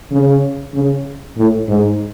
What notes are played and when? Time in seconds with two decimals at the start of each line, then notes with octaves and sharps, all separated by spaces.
0.12 C#3
0.75 C#3
1.37 A2
1.69 G#2